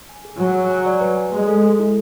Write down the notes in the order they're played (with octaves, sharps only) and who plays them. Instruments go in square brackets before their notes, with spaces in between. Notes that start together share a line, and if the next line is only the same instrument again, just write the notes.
[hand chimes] G#5
G#4
[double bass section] F#3 [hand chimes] G#5
[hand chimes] G#4
G#5
D5
B4
G#5
[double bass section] G#3 [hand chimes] A3
[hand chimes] A4
A4
E4